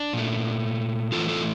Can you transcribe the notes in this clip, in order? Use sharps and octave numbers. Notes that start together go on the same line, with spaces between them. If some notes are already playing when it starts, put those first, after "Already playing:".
Already playing: D4
A#2 A3
A2 E3 A3 F4 A4
F4 A4